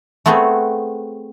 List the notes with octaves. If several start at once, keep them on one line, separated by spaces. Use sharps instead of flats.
A3 B3 C4 F#4 G#4